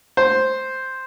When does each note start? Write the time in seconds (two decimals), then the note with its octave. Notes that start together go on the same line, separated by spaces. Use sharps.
0.17 C5